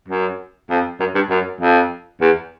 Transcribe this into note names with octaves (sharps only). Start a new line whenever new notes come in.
F#2
F2
F#2
G2
F#2
F2
E2